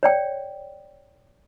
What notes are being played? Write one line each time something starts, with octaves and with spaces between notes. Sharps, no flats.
C#5 D5 G5